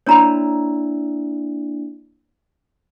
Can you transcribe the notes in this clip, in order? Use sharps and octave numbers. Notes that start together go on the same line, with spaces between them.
A#3 D4 E4 C#5 A#5 B5